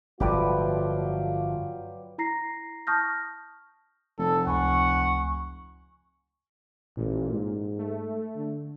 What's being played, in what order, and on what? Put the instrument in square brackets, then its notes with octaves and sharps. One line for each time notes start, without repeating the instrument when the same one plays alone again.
[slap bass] G1 A2 F3 [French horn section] F#3 F4 [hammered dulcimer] G4 B4 D5
[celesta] E4 A#5 A#6 C7
A5 C#6 D#6 F6 G6 A#6
[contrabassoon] F1 [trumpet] A4
[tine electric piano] C#2 G#5 B5 [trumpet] F#5 [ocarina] C#6
[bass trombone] A1 [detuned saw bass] A#2
[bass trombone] G#2
[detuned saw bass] A3
[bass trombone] D3